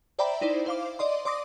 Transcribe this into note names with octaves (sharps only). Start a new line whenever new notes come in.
C5 D5 E5 G5 A#5 B5
D#4 E4 C5 D5
C5 F5 D6
D5 D#5 C6
D5 C6 D6 D#6 A#6